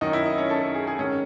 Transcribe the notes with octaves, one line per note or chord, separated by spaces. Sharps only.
F#2 D#3 D#4
E4
D#4
C#4
A4
A4
G#4
G#4
G#2 D#3 C#4